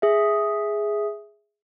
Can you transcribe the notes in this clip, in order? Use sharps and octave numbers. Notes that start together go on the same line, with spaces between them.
G#4 E5